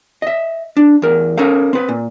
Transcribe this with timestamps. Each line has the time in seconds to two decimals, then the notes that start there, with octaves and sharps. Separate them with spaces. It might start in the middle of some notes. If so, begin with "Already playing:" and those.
0.22 D#5 E5
0.77 D4
1.02 E2 A#4
1.38 C#4 A4 A#4 F5
1.73 C4 B4
1.89 A#2